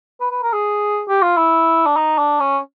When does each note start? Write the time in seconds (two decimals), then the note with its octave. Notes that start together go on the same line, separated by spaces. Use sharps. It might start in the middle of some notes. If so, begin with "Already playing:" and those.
0.20 B4
0.31 B4
0.43 A#4
0.53 G#4
1.09 G4
1.22 F4
1.37 E4
1.86 D4
1.96 D#4
2.18 D4
2.40 C#4